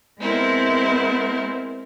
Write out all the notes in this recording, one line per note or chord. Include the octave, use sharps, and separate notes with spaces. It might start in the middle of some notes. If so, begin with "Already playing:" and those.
G#3 B3 C4 E4 A#4